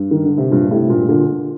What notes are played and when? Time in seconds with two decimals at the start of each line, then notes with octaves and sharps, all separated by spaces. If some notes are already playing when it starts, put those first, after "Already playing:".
Already playing: G2
0.11 D#3
0.25 D3
0.38 C3
0.51 G2 A#2
0.71 A2 C3
0.90 G2 A#2
1.09 A#2 D3